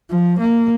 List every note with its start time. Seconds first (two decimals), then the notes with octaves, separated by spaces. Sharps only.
0.10 F3
0.39 A#3